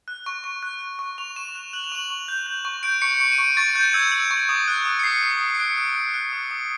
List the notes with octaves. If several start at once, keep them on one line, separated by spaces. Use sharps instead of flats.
F#6
C#6
C#6
F#6
F#6
C#6
C#6 F7
C#6 E7
F#6 F7
F#6 F#7
F7
C#6 F#7
C#6
G6
G6
C#6
G6 D7
C#6 C#7
C#6 D7
D#7
C#6 D7
C#6 A6
G6
E6 G#6
E6
C#6
D#6
F#6
D#6
C#7
D#6 C7
D#6
C#7
D#6
C#7
F#6 D7
D#6 D7
F#6
F#6
D#6
D#6